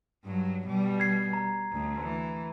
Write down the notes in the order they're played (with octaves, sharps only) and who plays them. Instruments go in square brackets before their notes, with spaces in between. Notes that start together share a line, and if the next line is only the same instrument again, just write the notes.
[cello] G2 F#3
B2 G3
[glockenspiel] G#6 C7
A#5
[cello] D2
E3